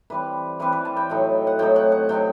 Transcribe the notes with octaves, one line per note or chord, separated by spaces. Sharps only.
E3 G3 C4 B4
E3 G3 C4 B4
B4
A5
G5
A2 F#3 A3 D#4
F#5
A2 F#3 A3 D#4 G5
F#5
F#5
C3 F#3 C4 D#4 G5